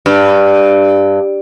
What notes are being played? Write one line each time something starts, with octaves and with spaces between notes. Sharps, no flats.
G2